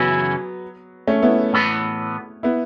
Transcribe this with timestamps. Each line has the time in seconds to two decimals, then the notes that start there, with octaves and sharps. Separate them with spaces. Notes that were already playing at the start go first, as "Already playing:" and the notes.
Already playing: F#2 C#3 E3 F#3 B3 C#4 E4
1.07 A3 C#4
1.22 B3 E4
1.53 A2 E3 B3
2.43 B3 E4